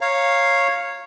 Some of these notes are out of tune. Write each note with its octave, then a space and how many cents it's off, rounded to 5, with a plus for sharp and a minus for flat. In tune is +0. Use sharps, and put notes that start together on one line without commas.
C#5 -10 F5 +0 A#5 +0